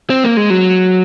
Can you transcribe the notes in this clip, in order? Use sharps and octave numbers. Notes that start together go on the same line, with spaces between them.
C4
A#3
G#3
F#3